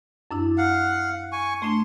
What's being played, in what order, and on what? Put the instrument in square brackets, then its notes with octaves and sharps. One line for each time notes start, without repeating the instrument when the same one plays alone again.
[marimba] F#2 D4 E4
[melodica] F5 F#5
G#5 C#6
[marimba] A3 D4 [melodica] C6